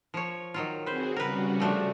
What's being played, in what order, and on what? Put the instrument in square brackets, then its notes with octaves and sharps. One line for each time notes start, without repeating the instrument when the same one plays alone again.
[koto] F3 C#5
D#3 F#3 F4
[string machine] C4 F#4 G#4 [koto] B4 C5
[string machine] C#3 G3 F#4 [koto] A#4 B4
[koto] F3 A3 D4